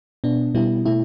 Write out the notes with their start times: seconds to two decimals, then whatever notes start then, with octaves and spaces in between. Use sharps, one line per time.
0.24 B2 B3 D4
0.55 B2 G3 B3 E4
0.86 B2 A3 E4